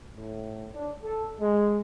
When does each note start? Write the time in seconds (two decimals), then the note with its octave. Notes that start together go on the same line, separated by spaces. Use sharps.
0.15 A2
0.73 D4
1.03 A4
1.40 G#3